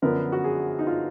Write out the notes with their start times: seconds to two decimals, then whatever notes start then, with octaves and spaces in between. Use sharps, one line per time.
0.02 F#2 D3 F3 B3 A#4
0.32 F#4
0.44 G#4
0.79 D#4
0.87 F4